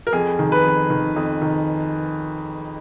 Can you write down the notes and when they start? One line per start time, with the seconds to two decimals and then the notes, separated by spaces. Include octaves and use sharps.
0.07 A#4
0.13 F2 G#4
0.39 D#3
0.52 B4
0.64 F2
0.90 D#3
1.16 F2
1.42 D#3